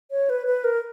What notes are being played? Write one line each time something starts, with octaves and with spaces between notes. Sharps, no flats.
C#5
B4
B4
A#4